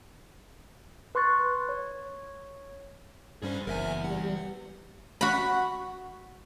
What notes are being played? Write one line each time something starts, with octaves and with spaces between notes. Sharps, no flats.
B4 C6 C#6 F#6 A6
C#5
G2 G3 C#4 G#4 C5
F#1 E2 A#4 E5 G#5
G3 F#5
F#4 B5